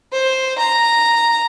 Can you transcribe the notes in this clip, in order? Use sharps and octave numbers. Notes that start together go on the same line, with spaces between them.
C5
A#5